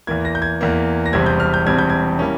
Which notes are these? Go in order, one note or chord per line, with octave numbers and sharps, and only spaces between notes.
E2 E3 A#3 G#6
A#6
G6
G#6
E2 E3 A#3
A#6
E1 E2 C3 G3 C4 G#6
G6
F6
G6
E1 E2 C3 G3 C4 G#6
G6
G#6
E3 G3 A#3 C#4